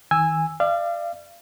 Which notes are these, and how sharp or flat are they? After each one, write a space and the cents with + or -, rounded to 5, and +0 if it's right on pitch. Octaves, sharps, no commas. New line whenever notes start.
D#3 +40 G#5 -10 E6 +0
D5 +25 F5 -30